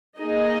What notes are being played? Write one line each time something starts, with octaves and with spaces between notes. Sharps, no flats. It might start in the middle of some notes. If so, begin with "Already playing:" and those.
A#3 D#4 G#4 D#5